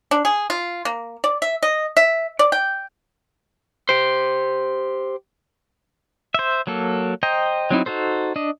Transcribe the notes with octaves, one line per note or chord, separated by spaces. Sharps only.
D4
G#4
F4
A#3
D5
E5
D#5
E5
D5
G5
G4 C5
C5 E5
F#3 A#3 A4
C5 D#5 G5 A#5
F#3 C4 D#4 E4
D#4 F#4 A4 C5
D4 D#5